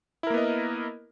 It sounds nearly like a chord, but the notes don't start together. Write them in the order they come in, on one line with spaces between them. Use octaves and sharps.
E4 A#4 A#3 B3 D#5